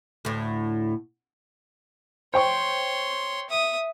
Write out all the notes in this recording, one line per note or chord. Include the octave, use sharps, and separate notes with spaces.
D2 A2
C5 C#5 G5 C6 C#6
E5 D#6